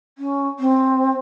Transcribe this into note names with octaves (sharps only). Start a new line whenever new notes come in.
C#4
C4